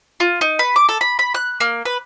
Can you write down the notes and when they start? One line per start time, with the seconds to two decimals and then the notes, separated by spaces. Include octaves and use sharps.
0.20 F4
0.41 D#4
0.59 B4
0.76 D6
0.89 A4
1.01 B5
1.19 B5
1.34 F#6
1.60 A#3
1.86 B4